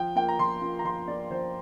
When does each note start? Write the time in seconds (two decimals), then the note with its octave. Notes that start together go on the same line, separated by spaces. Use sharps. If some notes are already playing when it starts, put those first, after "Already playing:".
Already playing: F3 G5
0.16 A#3 F4 G5
0.29 A#5
0.39 F3 C6
0.61 A#3 F4
0.79 A#5
0.84 F3 C6
1.07 A#3 F4 D5
1.31 F3 C5